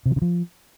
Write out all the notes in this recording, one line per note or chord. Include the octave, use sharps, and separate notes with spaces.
C3
F3
C#3
F3